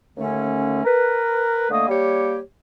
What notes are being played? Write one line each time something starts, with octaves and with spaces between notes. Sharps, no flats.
D#2 D3 A3 C#4
A#4 B4
D3 A3 A#3 D#5 D#6
G3 A#3 G4 C#5